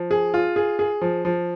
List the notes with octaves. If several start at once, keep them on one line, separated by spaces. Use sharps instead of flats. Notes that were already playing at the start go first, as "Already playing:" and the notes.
Already playing: F3
G#4
F4
G#4
G#4
F3
F3